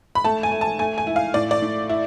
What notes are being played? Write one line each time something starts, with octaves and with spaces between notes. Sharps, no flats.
B5
A3 A5
G#5
A3
A5
A3 G#5
G#5
E4
F5
A2 D5
D5
A2
E4